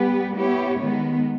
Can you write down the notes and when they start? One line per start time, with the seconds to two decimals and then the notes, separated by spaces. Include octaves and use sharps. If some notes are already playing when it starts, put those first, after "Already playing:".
Already playing: G3 B3 G4 B4
0.36 B3 E4 G4 C#5
0.81 D#3 G#3 B3